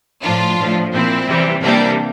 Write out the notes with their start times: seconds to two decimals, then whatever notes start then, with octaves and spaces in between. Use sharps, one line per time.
0.22 A2 F3 D4 F4
0.58 A2 F3
0.92 A#2 F3 C4 E4
1.27 C3 E3 G3
1.62 C3 E3 G3 A#3 D4